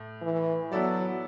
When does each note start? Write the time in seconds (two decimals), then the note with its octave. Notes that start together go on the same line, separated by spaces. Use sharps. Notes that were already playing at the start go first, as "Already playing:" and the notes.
Already playing: A2
0.22 E3
0.71 F#3 B3 E4 A4 D5